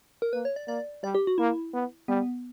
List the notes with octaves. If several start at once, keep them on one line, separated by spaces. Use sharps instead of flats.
A#4
A#3 B4
C#5
D5
A#3 D5
G3 D5
G4
F#4
A#3 E4
B3
G3 B3